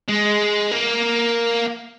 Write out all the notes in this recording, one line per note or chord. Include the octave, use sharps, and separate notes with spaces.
G#3
A#3